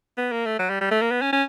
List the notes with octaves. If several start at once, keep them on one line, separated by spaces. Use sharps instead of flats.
B3
A#3
A3
F#3
G3
G3
A3
A#3
B3
C#4
C#4